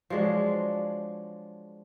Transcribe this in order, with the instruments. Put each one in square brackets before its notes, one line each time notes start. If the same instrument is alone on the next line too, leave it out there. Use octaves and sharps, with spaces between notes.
[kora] F3 F#3 G#3 D4